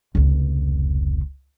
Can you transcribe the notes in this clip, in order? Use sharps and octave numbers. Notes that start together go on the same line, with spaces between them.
F1 C#2